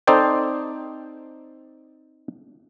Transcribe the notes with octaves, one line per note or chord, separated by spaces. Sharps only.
C4 D#4 A4 C5 D5 G5